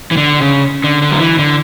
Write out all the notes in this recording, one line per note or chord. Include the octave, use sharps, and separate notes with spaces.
E3
D3
C#3
D3
D3
F#3
E3
D3